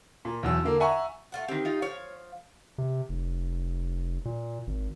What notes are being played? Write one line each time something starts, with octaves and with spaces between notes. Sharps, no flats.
A#2
B1 E2 E6
D3 A#3
E5 F#5 G#5 A#5 C#6
A3 F4 F#5
D#3 C4 G4
D#4 F4
F3 C#5 F5
C3
F1
A#2
G#1